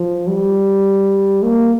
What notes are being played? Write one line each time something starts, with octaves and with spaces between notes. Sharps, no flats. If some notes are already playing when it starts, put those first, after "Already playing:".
Already playing: F3
G3
A#3